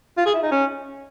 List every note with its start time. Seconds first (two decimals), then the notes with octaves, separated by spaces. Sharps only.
0.17 F4
0.26 G#4
0.34 E4
0.43 D#4
0.51 C#4